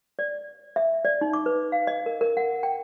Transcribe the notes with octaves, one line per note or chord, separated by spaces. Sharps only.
D5
E5
D5
D#4
D6
B4
F5
D#5
A#4
A#4
F#5
G5